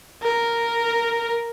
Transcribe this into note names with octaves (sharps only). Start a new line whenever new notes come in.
A#4